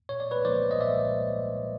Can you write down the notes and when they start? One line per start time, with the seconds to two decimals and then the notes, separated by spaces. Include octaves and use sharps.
0.09 A#2 C#5
0.20 D5
0.31 B4 C#5
0.45 F3 A#3 D#4 C5 D5
0.71 D#5
0.80 A#2 D5 E5